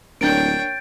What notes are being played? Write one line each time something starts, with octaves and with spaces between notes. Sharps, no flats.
D1 A#3 D4 C#5 G5 G6 A6 D7